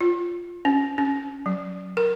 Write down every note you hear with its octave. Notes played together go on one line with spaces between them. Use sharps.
F4
C#4
C#4
F#3
A#4